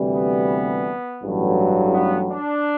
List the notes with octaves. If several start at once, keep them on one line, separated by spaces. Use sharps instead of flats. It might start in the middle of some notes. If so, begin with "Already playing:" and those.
Already playing: D2 C3 E3 G3
B3
A1 G2 F#3
B3
D4